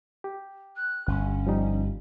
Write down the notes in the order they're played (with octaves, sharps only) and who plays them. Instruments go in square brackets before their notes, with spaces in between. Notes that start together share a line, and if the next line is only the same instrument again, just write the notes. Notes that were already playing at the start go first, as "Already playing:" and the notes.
[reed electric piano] G4
[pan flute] F#6
[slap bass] G1 [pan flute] C#4
[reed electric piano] F3 G3 D#4